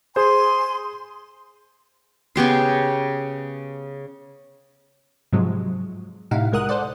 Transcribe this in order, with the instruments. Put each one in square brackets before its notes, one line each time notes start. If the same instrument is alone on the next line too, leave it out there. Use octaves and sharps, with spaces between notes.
[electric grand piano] G#4 C5 [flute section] G#5 C6
[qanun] C#3 B3 G4 C6
[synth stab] G#2 C3 F3 F#3 G#3
A2 C3 D#4 E4 F5 F#5
C2 G#3 A#4 F#5 D#6 F#6
A4 C5 D5 F#5